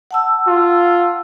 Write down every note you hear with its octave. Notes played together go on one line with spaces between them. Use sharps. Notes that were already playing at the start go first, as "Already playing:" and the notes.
F#5 A5 E6
F4